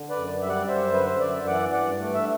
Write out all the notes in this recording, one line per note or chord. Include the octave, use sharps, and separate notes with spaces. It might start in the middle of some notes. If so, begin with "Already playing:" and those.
Already playing: D3
B4 D5
F#2
G3 E5
D5 F#5
F#2 C5 E5
D3 B4
C5
F#2 D5
E5
E3 D5 F#5
G2 D5 F#5
A3
E5